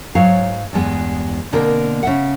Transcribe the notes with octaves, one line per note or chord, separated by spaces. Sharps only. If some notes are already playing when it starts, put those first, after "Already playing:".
G#2 F#3 C#5 F5
E2 G2 G#3 B3
B2 D3 A#3 C4 A#4
C#3 E5 F#5